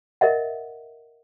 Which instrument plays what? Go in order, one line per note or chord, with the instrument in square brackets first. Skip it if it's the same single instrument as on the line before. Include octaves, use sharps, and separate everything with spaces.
[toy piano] A#4 D#5 E5 F#5